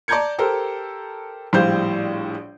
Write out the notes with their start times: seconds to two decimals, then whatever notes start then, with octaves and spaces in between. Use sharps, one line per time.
0.08 D5 A5 A#5 G6 G#6 C#7
0.38 G4 A4 A#4 C5
1.53 A#1 A2 G3 C5 F5 G6